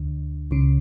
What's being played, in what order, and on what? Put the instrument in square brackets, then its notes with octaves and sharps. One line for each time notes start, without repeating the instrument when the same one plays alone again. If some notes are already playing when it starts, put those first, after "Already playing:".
Already playing: [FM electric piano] D2 D3
C#2 C#3